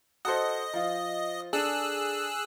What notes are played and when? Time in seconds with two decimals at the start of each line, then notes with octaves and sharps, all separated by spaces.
0.25 F#4 A4 C5 D#5
0.74 F3 F4
1.53 D4 G#4 A4 E6 F#6